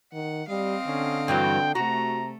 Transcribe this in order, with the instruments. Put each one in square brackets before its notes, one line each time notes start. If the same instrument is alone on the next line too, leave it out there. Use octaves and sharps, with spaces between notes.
[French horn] D#3 [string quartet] F#5
[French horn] G3 [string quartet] C4 D#5 F5
[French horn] D3 [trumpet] C#4
[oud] G2 E3 F#3 [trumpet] G5
[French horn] C3 [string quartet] A3 [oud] F#4 [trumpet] A#5